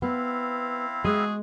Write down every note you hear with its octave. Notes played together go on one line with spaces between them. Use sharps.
B3 C4 E4 F5
G#3 F#4 G#4